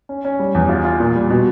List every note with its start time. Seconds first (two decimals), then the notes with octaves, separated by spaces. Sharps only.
0.09 C#4
0.25 C#4
0.39 G3
0.55 E2
0.69 F4
0.85 F4
1.00 A#2
1.15 G3
1.30 B2